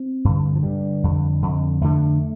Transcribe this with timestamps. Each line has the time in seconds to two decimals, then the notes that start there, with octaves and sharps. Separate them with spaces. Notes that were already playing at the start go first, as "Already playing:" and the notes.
Already playing: C4
0.25 G2 D3
0.56 F3
0.63 G2 D3 G3
1.04 F2 D3
1.42 F2 D3
1.81 F2 D3 A3